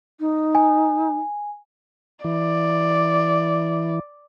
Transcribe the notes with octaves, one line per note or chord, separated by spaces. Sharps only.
D#4
G#5
E3 D5